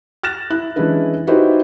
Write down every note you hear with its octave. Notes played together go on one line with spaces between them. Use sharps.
F6 F#6 A6 A#6 E7
E4 F#6
E3 G#3 C#4 D4 E4 B4
D#4 E4 F#4 G4 B4 C5